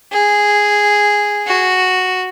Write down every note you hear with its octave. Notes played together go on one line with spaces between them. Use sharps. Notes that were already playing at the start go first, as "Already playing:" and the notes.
G#4
F#4